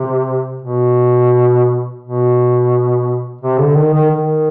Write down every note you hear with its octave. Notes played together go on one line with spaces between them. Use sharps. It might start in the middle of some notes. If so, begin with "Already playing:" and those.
Already playing: C3
B2
B2
C3
D3
D#3
D#3
D#3